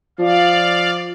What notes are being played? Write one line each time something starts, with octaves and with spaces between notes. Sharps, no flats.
F3 D5 F5